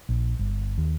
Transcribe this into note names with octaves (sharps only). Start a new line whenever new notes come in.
A#1
G1
D#2